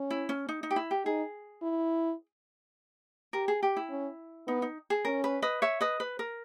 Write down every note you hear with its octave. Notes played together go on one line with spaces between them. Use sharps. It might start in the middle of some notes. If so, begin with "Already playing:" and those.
Already playing: C#4
E4
C#4
D#4
D#4
G4
E4
G4
D#4 G#4
E4
G4 A#4
G#4
G4
E4
C#4
B3 D#4
D#4
G#4
C#4 A#4
B4
B4 D#5
C#5 E5
B4 D#5
B4
A#4